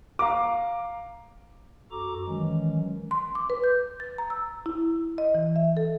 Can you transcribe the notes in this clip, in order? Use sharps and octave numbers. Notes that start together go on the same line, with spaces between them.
F5 A#5 D6
F#2 F#4 A4 A#5 D6
D#3 E3 F#3 G#3 C#4
C6
D6
B4
G6
A6
A#5
E6
E4
D#5
E3
E5
A4